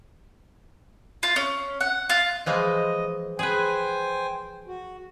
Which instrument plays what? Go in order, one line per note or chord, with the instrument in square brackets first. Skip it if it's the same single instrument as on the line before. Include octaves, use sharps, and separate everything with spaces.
[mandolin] F4
C#4
F#5
F4
[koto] E3 F3 G#3 [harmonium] D#5
[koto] G#4 B4 [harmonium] C5 G5 G#5
[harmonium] F#4